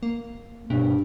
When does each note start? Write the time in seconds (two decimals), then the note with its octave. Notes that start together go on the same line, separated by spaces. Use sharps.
0.03 A#3
0.70 G2 B2